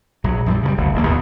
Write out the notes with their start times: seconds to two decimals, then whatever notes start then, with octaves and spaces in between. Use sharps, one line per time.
0.24 A#1 F#3
0.46 A#1 F#2 E3 G3
0.63 C#3 E3 G3
0.77 F#1 D2
0.94 D#1 A#1 A#3
1.08 D#2 A#2 B3